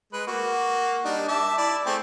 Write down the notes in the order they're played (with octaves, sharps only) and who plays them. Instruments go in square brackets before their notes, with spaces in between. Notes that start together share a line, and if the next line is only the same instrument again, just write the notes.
[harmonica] G#3 B4
A#3 F#4
G3 D4 D#4
E5 A5 D6
E4 D5
A3 C4 G#4